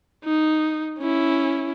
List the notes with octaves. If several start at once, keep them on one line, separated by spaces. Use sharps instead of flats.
D#4
C#4 E4